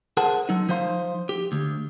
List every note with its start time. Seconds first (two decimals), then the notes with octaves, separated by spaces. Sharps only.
0.17 G#4 A#4 C5 F#5 A5
0.49 F#3 D#4
0.69 F3 D#4 C5 F5 C6
1.29 G4
1.52 D2